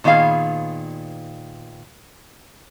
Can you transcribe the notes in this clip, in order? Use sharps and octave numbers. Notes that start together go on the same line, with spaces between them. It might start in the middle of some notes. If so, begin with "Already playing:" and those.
A#2 D#3 B3 G#4 F5